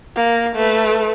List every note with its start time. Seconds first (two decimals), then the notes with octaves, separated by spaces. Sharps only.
0.16 A#3
0.56 A3 B4